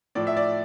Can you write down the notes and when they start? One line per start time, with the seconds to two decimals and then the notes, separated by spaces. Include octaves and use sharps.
0.15 A2 F3 D5
0.27 E5
0.37 D5